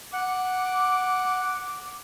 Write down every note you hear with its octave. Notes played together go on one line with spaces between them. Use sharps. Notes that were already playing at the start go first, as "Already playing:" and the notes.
F#5 D6